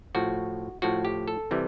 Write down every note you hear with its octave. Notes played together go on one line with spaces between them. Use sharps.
A2 F3 F#4
A2 F3 F#4
G4
A4
C3 E3 G3